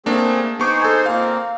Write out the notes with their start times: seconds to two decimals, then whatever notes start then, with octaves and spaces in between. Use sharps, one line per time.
0.06 A3 A#3 C4 D4 G#4
0.60 B3 D#4 G#4 C5 C#6 D6
0.82 A4 G#5
1.06 A#2 A#3 C4 F5